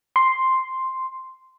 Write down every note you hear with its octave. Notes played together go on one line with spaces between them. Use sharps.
C6